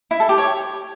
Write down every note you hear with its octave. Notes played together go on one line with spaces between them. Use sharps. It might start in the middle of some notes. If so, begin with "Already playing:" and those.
E4
A4
G4
C#5